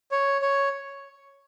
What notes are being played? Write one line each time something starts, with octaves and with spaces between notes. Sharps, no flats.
C#5
C#5